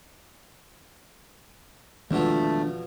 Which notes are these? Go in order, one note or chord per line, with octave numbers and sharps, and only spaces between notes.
E2 B2 D#3 F3 G#3 A3 B3 D4